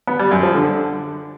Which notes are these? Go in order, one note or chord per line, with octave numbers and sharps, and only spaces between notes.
B3
G3
F#2
F3
D3